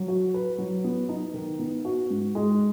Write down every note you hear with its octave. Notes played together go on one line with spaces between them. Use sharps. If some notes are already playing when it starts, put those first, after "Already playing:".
Already playing: F#3
F#4
B4
F#3
B3
D#4
D#3
B3
F#4
G#2
G#3